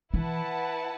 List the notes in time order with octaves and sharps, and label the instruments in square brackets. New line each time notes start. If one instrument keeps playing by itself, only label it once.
[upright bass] E3 [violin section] E4 B4 F#5 A5